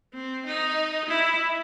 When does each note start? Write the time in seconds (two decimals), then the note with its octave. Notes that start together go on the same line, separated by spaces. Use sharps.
0.13 C4
0.46 D#4
1.09 E4